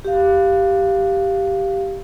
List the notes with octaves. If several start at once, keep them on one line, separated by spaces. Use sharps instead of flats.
G4 F5